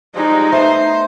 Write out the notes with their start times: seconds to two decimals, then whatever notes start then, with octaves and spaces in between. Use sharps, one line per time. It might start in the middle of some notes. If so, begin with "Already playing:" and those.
0.15 F3 G3 G#3 D#4
0.52 A3 B3 C5